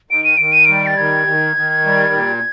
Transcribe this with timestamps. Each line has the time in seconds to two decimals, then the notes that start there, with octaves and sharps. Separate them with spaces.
0.11 D#3 D7
0.24 D#7
0.38 D#3 D7
0.52 D#7
0.65 G3 D7
0.87 A6
0.97 D#3 G#6
1.27 D#3
1.56 D#3
1.85 G3
2.13 A#2